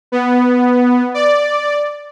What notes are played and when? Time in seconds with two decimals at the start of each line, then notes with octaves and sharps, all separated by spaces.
0.12 B3
1.14 D5